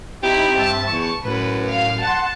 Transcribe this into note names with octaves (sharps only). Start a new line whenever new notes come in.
C4 D#4 E4 G4 A#5
G2 C4 E5 A5
E2 C#6
F#2 A2 B4
F5
F#5 A5 C6